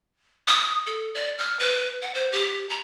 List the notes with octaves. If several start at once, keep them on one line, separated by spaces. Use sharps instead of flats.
D#6
A4
D5
F6
B4
F#5
C5
G4
A#5